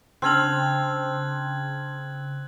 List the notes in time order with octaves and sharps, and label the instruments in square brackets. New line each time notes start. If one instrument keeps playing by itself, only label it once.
[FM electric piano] C#3 [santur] C4 [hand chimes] D4 A5 F6 [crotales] F#6 G#6 F#7